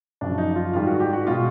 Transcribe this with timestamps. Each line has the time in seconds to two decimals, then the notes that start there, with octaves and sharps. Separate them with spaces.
0.21 F#2 C#3 F3 D4
0.38 D#4
0.56 F4
0.73 G#2 D#3 G3 F4
0.87 F#4
1.00 G4
1.13 F#4
1.27 B2 G#3 F4